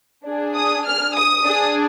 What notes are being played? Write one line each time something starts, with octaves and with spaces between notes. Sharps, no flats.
D4 G#4
D#6
F6
D#6
D4 G#4